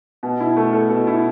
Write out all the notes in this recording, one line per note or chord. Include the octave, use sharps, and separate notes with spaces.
B2
E4
A3
A4
B2
E4